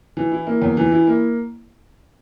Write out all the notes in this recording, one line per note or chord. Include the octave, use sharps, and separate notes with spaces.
E3
E4
A#3
E2
E3
E4
A#3